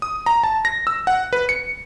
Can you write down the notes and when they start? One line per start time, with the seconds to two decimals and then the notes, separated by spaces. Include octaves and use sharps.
0.02 D#6
0.26 A#5
0.43 A5
0.65 A#6
0.87 E6
1.07 F#5
1.33 B4
1.49 C#7